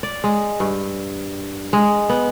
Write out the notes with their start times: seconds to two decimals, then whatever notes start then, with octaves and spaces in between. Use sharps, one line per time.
0.03 D5
0.24 G#3
0.60 G2
1.73 G#3
2.09 B3